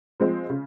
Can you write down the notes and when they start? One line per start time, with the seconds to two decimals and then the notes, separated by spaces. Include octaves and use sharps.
0.20 F3 G#3 C4
0.50 C#3